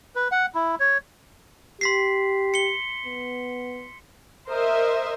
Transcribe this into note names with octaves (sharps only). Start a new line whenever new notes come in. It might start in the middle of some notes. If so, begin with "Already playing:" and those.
B4
F#5
E4
C#5
G4 C6 B6 C7
C#7 G7
B3
A#4 C5 D#5 E5